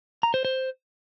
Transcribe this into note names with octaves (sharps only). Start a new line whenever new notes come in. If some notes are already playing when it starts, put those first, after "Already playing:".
A#5
C5
C5